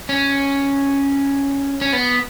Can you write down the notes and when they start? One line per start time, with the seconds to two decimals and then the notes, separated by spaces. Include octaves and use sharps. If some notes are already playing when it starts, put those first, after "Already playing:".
0.09 C#4
1.81 C#4
1.93 B3